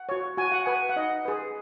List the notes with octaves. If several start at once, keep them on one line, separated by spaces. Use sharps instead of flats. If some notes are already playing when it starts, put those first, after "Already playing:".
Already playing: F#5
F#4 C#5
F#4 G#5
F#5
B4 G#5
F#5
D#4 D#5
G#4 B4